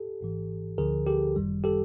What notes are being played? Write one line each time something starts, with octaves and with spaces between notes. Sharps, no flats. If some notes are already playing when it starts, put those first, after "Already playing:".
Already playing: G4 A4
G#1 G#2 E3
D2 D3 F3 G#4 A#4
G4 A4
G1 F#2 D#3 G3
G4 A4